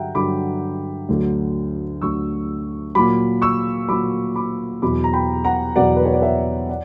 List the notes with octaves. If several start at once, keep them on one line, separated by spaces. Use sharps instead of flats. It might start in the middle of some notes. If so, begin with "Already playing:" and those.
Already playing: G2 D3 F#3 E5 F#5 G5 A#5
G2 D3 F#3 B5 D6
D2 D3 F#3
D2 D3 F#3 C#6 E6
A#2 F#3 B5 D6
C#6 E6
A#2 F#3 B5 D6
B5 D6
E2 B2 F#3 B5 D6
A#5
G5 B5
F#5 A#5
E2 B2 F#3 D5 F#5
B4
C#5
D5
C#5 E5
D5 F#5